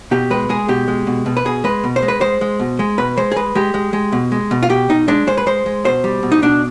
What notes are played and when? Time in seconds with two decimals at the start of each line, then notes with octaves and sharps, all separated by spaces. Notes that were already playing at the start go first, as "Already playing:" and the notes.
0.11 B2 G4
0.30 G#3 B4
0.49 G#3 G#4
0.69 B2 G4
0.88 G#3
1.07 B2
1.26 B2
1.37 B4
1.45 B2 G#4
1.64 G#3 B4
1.84 B2
1.96 C5
2.02 G#3
2.08 B4
2.21 G#3 C5
2.41 G#3
2.60 B2
2.79 G#3
2.98 B2 B4
3.17 G#3 C5
3.32 G#4
3.36 G#3 B4
3.55 G#3 G4
3.74 G#3
3.93 G#3
4.12 B2
4.32 G#3
4.51 B2
4.63 F4
4.70 B2 G4
4.89 B2 D#4
5.08 G#3 D4
5.27 G#3 C5
5.37 B4
5.46 G#3 C5
5.66 G#3
5.85 B2 C5
6.04 G3
6.23 B2
6.32 D#4
6.42 B2 D4